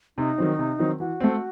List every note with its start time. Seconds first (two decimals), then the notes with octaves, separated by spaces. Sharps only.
0.17 C3 D#4
0.38 D#3 F#3 C4
0.59 C3
0.79 D#3 F#3 C4
1.00 E3 F#4
1.20 A3 C4